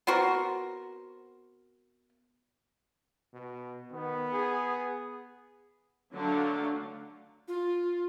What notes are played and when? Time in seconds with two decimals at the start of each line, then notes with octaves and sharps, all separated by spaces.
0.07 B3 C4 F#4 A#4
3.33 B2
3.92 D#3 B3
4.33 G#4
6.14 D3 F#3 A3 D4 F5
7.48 F4